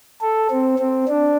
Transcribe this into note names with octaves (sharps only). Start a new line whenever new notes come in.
A4
C4
C4
D4